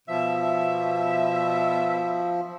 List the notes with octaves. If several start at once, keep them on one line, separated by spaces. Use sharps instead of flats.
B2 F3 E5